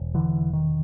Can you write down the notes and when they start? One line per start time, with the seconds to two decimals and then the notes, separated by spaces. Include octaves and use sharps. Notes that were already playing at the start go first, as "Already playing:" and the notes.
Already playing: E1
0.14 D3 E3
0.53 D#3